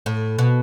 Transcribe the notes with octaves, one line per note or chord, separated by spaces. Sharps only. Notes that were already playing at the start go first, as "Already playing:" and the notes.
A2
B2